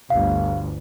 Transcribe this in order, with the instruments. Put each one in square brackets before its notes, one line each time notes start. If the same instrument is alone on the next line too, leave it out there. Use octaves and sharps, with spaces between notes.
[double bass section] G1 D2 [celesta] F5